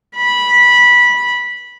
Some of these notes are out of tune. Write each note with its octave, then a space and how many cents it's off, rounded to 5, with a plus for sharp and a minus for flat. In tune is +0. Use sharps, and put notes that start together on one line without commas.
B5 -15